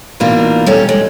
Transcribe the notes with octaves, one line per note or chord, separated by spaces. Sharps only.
B2 E3 A#3 D4 D#4 F4
G3 C#4 A4
G#3